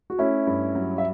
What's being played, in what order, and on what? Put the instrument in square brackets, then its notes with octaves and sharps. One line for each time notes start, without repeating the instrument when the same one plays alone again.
[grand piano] F#4
[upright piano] A3 [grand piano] C#4 E4
[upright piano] G2
F#3
[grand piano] E5